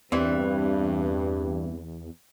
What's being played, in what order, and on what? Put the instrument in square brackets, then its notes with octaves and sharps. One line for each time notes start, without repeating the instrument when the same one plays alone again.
[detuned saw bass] E2 [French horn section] G2 [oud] E3 G3 [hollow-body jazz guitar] C4